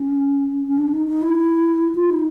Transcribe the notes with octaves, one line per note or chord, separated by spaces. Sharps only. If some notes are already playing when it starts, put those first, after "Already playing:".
Already playing: C#4
C#4
D4
D#4
D#4
E4
F4
D#4